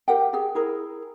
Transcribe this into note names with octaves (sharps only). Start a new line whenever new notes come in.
G4 A#4 F#5 G5
G4 G#4
E4 G#4 A#4